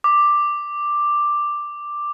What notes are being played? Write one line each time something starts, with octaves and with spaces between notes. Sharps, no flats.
D6